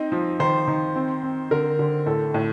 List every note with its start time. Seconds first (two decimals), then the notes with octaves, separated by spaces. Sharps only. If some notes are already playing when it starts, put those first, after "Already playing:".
Already playing: C4 D#4
0.12 F3
0.40 D#3 C5
0.68 D#3
0.96 C4
1.23 C4
1.51 D3 A#4
1.79 D3
2.06 A2 A4
2.34 A2